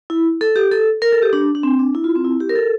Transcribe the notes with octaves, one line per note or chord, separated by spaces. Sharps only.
E4
A4
G4
A4
A#4
A4
G4
D4
D4
C4
D4
E4
F4
C4
E4
G4
A#4
A4